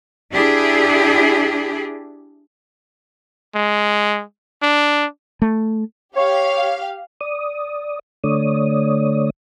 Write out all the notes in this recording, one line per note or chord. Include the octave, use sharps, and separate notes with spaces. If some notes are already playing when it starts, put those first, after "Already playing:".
D4 E4 G4 G#4
G#3
D4
A3
G4 C#5 F5
D5 D#6
D3 A3 C#5 D5 D#6